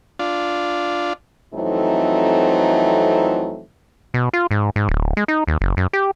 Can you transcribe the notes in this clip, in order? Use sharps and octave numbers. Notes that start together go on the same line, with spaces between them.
D4 F4
F2 E3 F#3 A3 C4 D#4
B2
F4
G#2
G#2
D1
G#3
D#4
D#2
F#1
F#2
G4